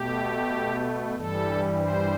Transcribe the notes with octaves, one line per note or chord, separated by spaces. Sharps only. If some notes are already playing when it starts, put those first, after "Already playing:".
Already playing: B2 A3 G4
G2 E3 G3 A4
C5